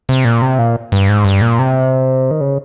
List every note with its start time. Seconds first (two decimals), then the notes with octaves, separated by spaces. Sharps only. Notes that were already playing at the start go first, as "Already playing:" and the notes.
0.09 C3
0.25 A#2
0.42 C3
0.59 A#2
0.92 G2
1.09 G#2
1.25 G2
1.41 A#2
1.59 C3
2.31 D#3
2.41 C#3